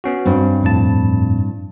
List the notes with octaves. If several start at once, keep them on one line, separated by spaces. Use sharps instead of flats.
B3 C#4 F#4
G2 C4
F2 A2 A5